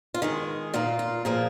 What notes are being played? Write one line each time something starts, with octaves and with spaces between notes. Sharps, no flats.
F4
D#3 G#3 G#4
A#2 A#3 F4
F4
A#2 F3 A#3 G#4